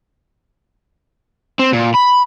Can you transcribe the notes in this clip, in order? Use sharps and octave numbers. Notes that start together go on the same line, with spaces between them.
C4
A#2
B5